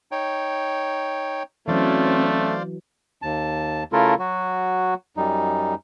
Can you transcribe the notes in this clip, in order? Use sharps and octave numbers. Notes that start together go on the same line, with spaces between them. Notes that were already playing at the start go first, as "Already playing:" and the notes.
D#4 C#5 G5
E3 F#3 A3 C4 C#4 C5 D5 F5
D#2 A5
C#3 A3 E4 F4 A4 A#4
F#3 F#4
F#2 G3 D#4